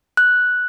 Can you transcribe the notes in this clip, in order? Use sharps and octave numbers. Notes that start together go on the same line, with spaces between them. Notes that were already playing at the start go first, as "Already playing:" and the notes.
F#6